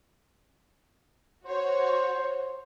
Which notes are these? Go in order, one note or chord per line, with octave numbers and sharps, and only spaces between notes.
F#4 C5 C#5